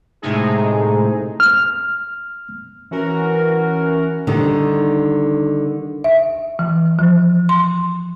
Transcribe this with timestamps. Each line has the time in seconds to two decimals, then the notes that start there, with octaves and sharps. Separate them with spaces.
0.22 A2 C3 G#3 A3 D#4 G#4
1.40 F6
2.91 E3 C#4 F#4 A#4
4.27 D3 D#3 G3
6.04 E5
6.59 E3
6.99 F3
7.49 C6